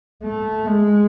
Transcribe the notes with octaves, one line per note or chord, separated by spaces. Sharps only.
A3
G#3